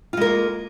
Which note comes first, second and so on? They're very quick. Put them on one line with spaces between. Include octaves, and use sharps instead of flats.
F4 G#3 A#4 A#3